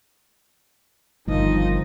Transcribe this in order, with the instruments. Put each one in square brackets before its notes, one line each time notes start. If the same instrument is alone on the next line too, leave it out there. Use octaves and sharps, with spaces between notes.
[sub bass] G1 [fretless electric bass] C2 G2 [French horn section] D#3 F3 [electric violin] D#4 D#5